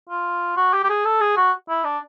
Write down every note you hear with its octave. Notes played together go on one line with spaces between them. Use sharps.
F4
F#4
G4
G4
G#4
A4
G#4
F#4
E4
D4